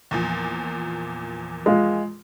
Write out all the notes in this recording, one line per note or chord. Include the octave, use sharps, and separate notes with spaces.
E2 A#2 F3
G#3 F4